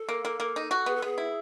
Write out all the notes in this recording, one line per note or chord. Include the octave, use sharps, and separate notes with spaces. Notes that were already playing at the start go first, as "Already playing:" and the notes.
Already playing: A4
A#3
A#3
A#3
D#4
F#4
B3 G#4
A4
B3 G#4
E4